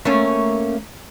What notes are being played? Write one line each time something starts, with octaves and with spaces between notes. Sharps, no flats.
A3 A#3 C#4